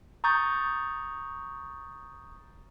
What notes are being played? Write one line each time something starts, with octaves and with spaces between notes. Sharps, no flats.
A#5 C#6 D#6 G6 A6